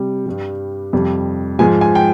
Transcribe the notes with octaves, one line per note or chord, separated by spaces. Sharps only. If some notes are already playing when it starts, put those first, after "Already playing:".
Already playing: C3 G3
G2 G3
F2 C3 G3
G#2 F3 G#3 G#5
G#5
G5